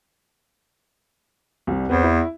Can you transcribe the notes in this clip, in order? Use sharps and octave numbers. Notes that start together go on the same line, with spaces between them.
C2 G3
E2 B3 C4
E4